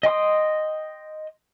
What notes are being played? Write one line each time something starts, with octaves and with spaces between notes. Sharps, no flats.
D#5 G5 C6 D#6